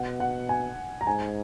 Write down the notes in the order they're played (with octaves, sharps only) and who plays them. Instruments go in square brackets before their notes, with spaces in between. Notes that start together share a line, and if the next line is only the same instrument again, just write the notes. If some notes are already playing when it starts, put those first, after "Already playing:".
Already playing: [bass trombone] B2 [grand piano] F#5
[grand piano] F#5
G#5
A#5
[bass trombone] G#2 [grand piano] G#5